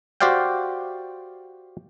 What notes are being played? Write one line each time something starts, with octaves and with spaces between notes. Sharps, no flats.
F#4 G4 C5 D5 F5 G5